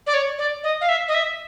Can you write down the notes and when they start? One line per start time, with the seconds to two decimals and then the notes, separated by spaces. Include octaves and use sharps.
0.07 D5
0.14 C#5
0.39 D5
0.64 D#5
0.81 F5
0.89 E5
1.08 D#5
1.14 E5